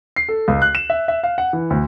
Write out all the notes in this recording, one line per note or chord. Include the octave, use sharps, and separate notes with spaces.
C7
A4
C#2
F#6
E7
E5
E5
F5
F#5
E3
D2